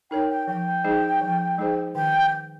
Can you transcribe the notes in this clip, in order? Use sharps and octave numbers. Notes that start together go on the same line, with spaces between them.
D#4 A#4 C#5 G5
G5
F3 G5
G#3 D#4 G#4 C5
F3
G#3 D#4 G#4 C5
D#3 G5